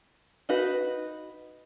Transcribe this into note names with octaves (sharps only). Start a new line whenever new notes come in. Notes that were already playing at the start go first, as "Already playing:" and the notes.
D#4 F#4 B4